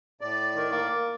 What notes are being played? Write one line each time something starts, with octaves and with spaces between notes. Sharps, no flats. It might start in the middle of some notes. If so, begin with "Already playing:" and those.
A2 D5
D#3
A#3